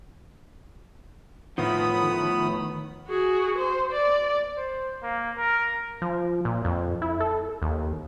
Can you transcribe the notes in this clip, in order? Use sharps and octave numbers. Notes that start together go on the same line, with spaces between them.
A2 D#3 F3 B3 B5 D#6
F#4 G#4
C5
D5
C5
A#3
A#4
F3
A#2
F2
E4
A4
D#2